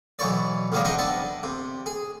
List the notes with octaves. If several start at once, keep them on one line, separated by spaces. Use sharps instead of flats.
B1 E3 E4 C#5 D5
E2 C#3 F3 G3 D4 D#4
C4 D4 D#4 D#5 F#5
B3 D4 E5 A5
C3
G#4